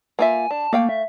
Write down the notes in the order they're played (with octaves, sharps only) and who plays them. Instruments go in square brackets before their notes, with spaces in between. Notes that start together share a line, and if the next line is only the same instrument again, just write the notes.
[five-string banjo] A#3 F4 E5 [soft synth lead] G#5
[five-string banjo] D4 [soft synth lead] A5
[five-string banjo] A3 F5 G5 [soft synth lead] A#3
[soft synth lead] E5